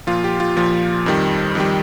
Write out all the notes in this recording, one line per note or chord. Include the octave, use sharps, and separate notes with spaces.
A#2 F3 F4
G4
F4
A#2 F3
F2 D#3 G3
F2 D#3 G3